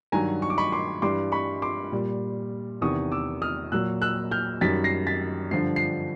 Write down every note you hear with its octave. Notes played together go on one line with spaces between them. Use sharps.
G2 D#3 F#3 G#5 A#5
C#6
D6
B5 C#6
C6 D6
G2 E3 G3 C6 D6
B5 C#6
C6 D6
A#2 G3
E2 C3 D#3 C#6 D#6
D6 E6
D#6 F6
A#2 F#3 E6 F#6
E6 F#6
F6 G6
F#2 D#3 G3 A6 B6
A#6 C7
A6 B6
G2 D3 F3 C7
C7